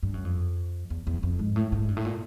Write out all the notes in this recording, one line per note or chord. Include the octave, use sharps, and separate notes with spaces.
G2
F#2
F2
E2
E2
F2
G#2
A2
G#2
G2
A2
A#2